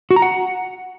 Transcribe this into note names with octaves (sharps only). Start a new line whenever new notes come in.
F#4
A#5
F#5